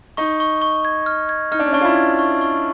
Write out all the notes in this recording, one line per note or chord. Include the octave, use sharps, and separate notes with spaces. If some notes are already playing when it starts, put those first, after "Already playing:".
D#4 C#6
C#6
C#6
G#6
F6
G#6
D#4 F6
D4
C#4
D4 C#6
F4
E4
G#6
C#6
C#6